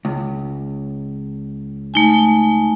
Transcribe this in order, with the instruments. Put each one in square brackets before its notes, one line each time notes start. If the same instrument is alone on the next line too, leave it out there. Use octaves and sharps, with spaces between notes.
[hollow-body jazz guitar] C#2
[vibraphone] A3 D#4 G#5